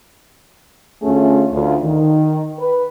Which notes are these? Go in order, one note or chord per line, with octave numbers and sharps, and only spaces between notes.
D2 A3 C#4 F4 G#4
D2 F4
D#3
B4